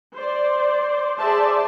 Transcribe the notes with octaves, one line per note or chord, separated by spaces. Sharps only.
C5 D5
G#4 C5 D5 E5 A5